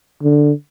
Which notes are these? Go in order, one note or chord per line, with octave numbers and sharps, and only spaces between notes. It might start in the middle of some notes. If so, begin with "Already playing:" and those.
D3